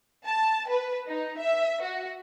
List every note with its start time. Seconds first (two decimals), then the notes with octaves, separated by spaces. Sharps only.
0.24 A5
0.68 B4
1.07 D#4
1.38 E5
1.82 F#4